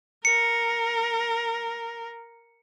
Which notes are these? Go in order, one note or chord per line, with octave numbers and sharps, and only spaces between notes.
A#4 C#7